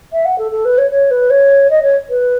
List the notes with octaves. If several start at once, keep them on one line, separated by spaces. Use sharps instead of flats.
E5
F#5
A4
A4
B4
C#5
C#5
B4
C#5
D#5
C#5
B4